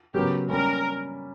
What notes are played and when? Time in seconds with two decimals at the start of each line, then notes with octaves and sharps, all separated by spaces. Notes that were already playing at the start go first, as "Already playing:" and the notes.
0.14 C#3 F#3 B3 F#4 G4 A#4
0.49 G3 A#3 C#4 A#4